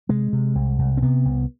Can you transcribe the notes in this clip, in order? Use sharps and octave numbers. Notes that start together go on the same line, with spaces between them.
C3 G#3
C3
C2
C2
C4
C3 B3
C2